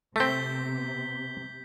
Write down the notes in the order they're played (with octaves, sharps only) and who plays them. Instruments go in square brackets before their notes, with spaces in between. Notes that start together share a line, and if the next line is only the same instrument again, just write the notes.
[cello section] C3 [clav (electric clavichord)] A3 C4 [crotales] G6 B6 G7